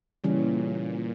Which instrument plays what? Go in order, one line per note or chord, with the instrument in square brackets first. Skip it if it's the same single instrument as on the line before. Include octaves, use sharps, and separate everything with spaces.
[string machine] A#2 [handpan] C#3 E3 G3 C#4